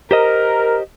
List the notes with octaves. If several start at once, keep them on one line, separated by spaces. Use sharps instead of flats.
G4 A#4 C5 D#5